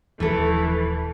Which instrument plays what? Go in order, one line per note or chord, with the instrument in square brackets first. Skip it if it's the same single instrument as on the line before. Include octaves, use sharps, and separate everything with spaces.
[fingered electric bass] D#1 F3 [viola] E3 [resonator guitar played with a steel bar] A3 A4